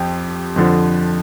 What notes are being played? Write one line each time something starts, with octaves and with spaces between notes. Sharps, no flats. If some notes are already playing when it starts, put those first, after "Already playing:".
Already playing: F2 F3 G4
F2 D3 F3